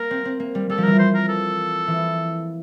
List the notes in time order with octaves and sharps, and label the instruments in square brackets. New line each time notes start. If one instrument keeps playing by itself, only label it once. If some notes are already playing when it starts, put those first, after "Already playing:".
Already playing: [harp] A#3 [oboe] A#4
[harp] C4
C4
A#3
G3
[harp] G3 [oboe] A4
[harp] F3
[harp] E3 [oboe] A#4
[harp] F3 [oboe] C5
[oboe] A#4
A4
[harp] E3